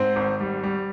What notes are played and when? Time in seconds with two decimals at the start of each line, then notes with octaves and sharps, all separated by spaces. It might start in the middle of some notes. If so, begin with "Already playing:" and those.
Already playing: G#2 C4 C5
0.16 G#1
0.40 G3
0.63 G3